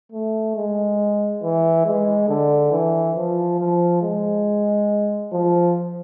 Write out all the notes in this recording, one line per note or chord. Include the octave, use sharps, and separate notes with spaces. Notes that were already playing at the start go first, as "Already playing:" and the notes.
A3
G#3
E3
G#3
D3
E3
F3
F3
G#3
F3